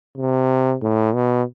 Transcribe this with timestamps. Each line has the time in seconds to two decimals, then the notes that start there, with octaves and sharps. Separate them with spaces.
0.17 C3
0.82 A2
1.15 B2